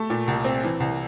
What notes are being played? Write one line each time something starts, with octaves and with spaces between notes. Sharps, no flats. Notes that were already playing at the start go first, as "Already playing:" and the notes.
Already playing: A3 A5
A#2
C2
C4
E3
C2